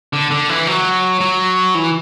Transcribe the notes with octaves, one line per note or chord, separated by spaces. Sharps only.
D3
D3
E3
F#3
F#3
E3